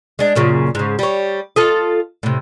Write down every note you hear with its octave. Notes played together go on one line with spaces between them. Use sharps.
G#3 D4
F#2 A#2 C#3
G#2 C#3
G3 C#5
F4 A4 D#5
A2 C3